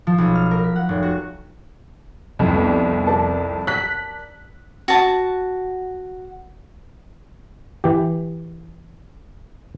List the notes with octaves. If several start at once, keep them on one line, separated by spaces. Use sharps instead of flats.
F3
B1
F6
A#4
B6
F#5
F1
F#4
C2 F2
B3 D4 D5
A#4 D5 A5
F#6 B6
F#4 A5
E3 G4